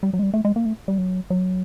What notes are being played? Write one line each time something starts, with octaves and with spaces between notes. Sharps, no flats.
G3
F#3
G#3
G3
A3
G#3
A#3
A3
G3
F#3
F#3